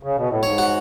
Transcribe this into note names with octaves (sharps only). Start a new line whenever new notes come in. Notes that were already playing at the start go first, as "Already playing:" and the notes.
C#3
B2
A2
G#2 C#5
F#4